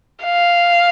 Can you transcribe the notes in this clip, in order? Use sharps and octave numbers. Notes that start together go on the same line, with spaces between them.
F5